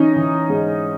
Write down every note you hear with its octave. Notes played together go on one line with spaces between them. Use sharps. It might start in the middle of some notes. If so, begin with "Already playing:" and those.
Already playing: E3 C#4 D#4
E3
G#2